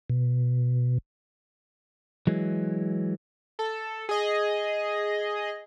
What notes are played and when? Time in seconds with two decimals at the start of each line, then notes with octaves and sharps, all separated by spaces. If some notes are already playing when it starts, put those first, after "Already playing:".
0.10 B2
2.27 E3 F#3 G#3
3.59 A4
4.09 G#4 D#5